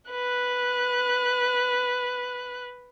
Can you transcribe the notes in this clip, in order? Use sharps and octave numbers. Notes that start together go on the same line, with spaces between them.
B4 F#6